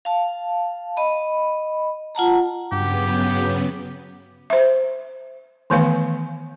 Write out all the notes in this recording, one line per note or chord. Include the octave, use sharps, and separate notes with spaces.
F5 A5
D#5 B5
F4 F#5 A5 A#5
G2 C#3 F#3 B3 G4 F#5
C5 E5
D#3 E3 A3 B3 B4 F5